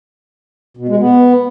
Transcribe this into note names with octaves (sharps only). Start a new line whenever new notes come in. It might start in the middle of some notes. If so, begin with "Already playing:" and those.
B2
G#3
B3